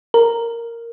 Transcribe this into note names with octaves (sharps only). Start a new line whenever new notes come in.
A#4